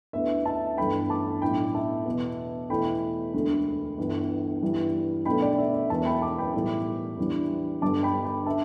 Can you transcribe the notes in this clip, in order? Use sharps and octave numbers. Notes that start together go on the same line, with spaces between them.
D2 D3 B3 E4 E5
E5 A5
G1 G2 E3 A3 G5 B5
A5 D6
B1 A2 A3 D4 G5 B5
E5 A5
E2 B2 B3
E2 B2 A3 E4 G5 B5
E1 D2 D3 A3
G1 G2 E3
G2 E3 G3 E4
B1 B2 A3 D4 G5 B5
D5 G5
E5
E5
E1 E2 E3 E5 A5
G5 B5
A5 D6
G5 B5
B1 A2 E3 G3
E2 E3 G3 D4
G1 G2 D3 G3 D4 A5 D6
G5 B5
G5 B5
D3 E5 A5